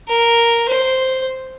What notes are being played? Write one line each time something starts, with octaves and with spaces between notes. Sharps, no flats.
A#4
C5